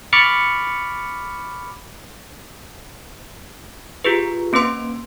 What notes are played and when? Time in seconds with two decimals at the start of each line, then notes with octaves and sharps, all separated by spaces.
0.13 B5 C#6 D6 F6 A6 C#7
4.04 F4 G4 G#4 B4
4.53 A#3 C4 C#4 B4 C6 D7